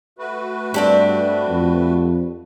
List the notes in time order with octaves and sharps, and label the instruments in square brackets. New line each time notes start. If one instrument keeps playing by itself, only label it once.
[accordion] A3 F#4 B4
[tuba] G2 [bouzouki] C4 D4 G4
[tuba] F2